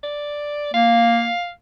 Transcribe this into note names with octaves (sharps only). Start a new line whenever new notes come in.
D5
A#3 F5